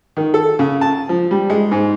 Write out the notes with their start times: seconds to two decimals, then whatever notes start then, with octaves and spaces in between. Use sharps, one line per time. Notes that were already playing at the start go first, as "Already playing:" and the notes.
0.17 D#3
0.34 A4
0.59 C#3
0.81 A5
1.09 F3
1.31 G3
1.50 G#3
1.72 G#2